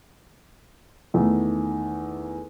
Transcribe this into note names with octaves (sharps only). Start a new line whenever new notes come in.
E2 D#3 A3 D#4